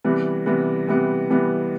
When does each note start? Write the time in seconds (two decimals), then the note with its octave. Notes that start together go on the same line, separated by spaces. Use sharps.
0.04 C3 E3 G3 B3
0.46 C3 E3 G3 B3
0.87 C3 E3 G3 B3
1.30 C3 E3 G3 B3